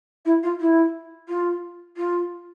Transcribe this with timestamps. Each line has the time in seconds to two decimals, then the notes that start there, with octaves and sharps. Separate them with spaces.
0.25 E4
0.43 F4
0.60 E4
1.28 F4
1.97 F4